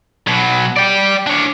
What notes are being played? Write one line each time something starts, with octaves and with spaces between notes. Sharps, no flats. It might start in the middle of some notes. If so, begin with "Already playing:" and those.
B2 F#3
D5 G5
D4 C#5